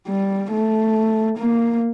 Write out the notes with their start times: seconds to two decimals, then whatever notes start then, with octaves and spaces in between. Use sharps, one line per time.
0.08 G3
0.52 A3
1.38 A#3